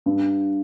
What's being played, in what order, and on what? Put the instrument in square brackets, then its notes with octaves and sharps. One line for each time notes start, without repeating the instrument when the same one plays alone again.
[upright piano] G2